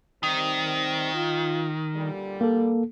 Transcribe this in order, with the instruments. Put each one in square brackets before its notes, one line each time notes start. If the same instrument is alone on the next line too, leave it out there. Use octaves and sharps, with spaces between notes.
[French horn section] C3 G3 C4 [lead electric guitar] D#3
[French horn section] F4
A#2 D3 G3
[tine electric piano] A#3 A4